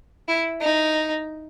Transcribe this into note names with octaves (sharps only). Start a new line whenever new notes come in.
E4
D#4